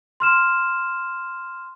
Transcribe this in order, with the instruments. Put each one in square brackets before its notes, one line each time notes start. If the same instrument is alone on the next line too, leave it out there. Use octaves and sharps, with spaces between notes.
[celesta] C6 F6 E7